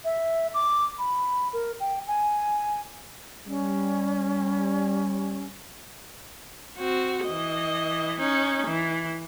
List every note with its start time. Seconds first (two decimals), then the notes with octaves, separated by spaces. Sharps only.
0.05 E5
0.54 D6
0.99 B5
1.53 A#4
1.80 G5
2.08 G#5
3.47 G3 C#4
6.78 C4 F#4
7.25 E3 D#5
8.20 C#4 D#4
8.67 E3